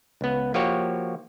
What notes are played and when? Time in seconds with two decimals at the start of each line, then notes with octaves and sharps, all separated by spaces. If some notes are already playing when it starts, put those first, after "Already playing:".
0.21 C#2 B3
0.54 F3 A#3 F#4 G4 C#5